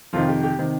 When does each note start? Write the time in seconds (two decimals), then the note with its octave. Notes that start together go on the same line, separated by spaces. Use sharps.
0.13 F2 C3 D#3 F4
0.28 G4
0.43 G4
0.58 C3 D#3